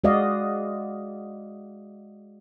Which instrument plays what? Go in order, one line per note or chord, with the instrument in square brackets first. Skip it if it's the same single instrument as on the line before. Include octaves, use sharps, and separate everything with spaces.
[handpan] G#3 F#4 D5 D#5 F5